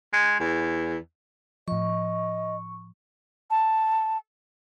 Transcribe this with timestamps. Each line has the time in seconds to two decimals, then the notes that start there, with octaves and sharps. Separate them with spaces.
0.13 G#3
0.40 E2
1.68 A2 F3 D#5 C#6
3.51 A5